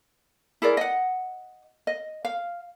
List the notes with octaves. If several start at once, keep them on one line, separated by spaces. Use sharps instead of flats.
E4 G#4 A#4 D5
D#5 F#5
D#5
F5